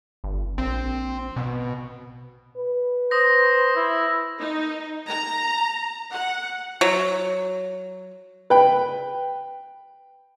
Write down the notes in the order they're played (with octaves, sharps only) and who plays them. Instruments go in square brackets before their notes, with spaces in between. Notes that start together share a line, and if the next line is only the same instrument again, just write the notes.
[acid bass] G1
[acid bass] A#1 [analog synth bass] C4
[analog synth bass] B2
[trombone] B4
[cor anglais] C5 [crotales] D#6 A#6
[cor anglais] E4
[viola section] D#4
A#5
F#5
[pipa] F#3
[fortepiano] B4 G5